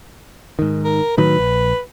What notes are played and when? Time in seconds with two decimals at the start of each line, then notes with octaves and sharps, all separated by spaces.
0.59 G#2 D#3
0.84 A#4
1.18 A2 D#3 F#3 B4
1.39 A#1